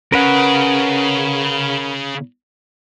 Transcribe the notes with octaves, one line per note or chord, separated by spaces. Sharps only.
C#3 A#4 B4 F#5